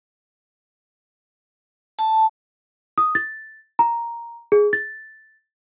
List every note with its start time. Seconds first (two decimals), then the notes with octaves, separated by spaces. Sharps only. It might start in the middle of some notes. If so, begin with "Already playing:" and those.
1.99 A5
2.98 D#6
3.15 A6
3.79 A#5
4.52 G#4
4.73 A6